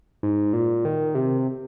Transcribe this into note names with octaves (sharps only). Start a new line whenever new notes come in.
G#2
A#2
D#3
C3